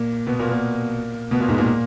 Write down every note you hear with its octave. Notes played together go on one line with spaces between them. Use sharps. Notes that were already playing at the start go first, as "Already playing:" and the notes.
Already playing: A#2 A#3
B2 B3
A#2 A#3
A#2 A#3
B2 B3
A#2 A#3
G#2 G#3
A#2 A#3